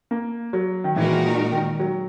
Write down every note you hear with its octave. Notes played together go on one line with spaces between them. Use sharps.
A#3
F#3
D#3
A#2 E3 G#3 D#4 F#4 A#4
D#3
F#3